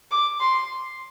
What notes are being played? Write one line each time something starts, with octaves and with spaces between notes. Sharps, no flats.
D6
C6